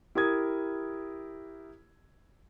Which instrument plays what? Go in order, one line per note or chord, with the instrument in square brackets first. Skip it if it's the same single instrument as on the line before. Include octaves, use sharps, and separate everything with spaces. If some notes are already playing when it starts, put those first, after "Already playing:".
[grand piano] E4 G4 A#4 D#6 G#6